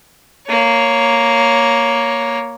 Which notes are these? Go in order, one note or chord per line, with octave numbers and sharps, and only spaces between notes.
A#3 C#5